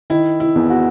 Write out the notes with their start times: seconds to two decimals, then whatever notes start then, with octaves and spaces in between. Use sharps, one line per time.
0.10 D#3 E4
0.40 E4
0.55 E2
0.70 F#4